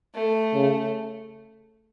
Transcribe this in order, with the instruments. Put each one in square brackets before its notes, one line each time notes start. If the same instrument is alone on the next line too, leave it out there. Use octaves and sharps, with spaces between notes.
[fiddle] A3
[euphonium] C#3